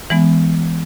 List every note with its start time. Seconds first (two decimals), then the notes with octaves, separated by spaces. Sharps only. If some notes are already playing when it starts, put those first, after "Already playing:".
0.10 E3 G#3 B3